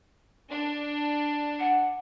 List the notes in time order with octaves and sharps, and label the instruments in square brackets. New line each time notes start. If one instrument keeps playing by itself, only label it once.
[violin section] D4
[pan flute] F#5